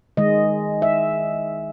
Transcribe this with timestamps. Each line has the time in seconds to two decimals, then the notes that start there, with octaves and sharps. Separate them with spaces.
0.17 D#3 G#3 D#5
0.82 E5